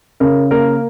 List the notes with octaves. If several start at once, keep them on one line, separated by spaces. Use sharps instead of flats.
C#3 A#4
A#3 A#4